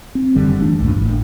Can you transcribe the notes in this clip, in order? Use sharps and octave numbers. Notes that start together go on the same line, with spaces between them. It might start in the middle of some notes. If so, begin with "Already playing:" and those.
C4
F#1 F#2 D3 G3
E3 A3 D4
C2 G2 A#2
G#1 A2